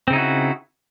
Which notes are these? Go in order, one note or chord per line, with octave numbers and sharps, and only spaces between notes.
C#3 C4 D#4 E4 F#4